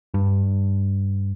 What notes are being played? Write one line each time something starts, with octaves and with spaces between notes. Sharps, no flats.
G2